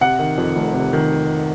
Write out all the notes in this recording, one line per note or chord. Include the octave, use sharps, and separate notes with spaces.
C3 F#5
D#3
F2
F1
C3
D#3